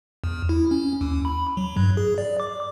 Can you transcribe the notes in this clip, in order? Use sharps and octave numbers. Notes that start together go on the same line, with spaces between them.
E2
E4
C#4
D#2
B5
F#3
G2
G#4
D5
D6